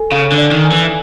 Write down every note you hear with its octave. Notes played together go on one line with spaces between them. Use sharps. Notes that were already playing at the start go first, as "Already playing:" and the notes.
Already playing: A4 G#5
C#3 F5
D3
D5
D#3
G#5
E3